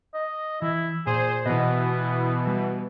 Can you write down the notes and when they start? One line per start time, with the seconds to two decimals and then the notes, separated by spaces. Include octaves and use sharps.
0.14 D#5
0.62 E3 E4
1.07 A#2 G#4 C5
1.46 B2 E3 B3 D#5
2.47 G3